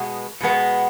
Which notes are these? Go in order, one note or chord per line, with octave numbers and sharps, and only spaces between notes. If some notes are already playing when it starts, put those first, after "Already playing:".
Already playing: B2 G#3 B3
B2 G#3 B3